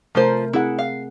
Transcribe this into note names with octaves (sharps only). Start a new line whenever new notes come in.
C3 F3 A3 F4 A#4 C5
C4 E4 G#4 F#5
F5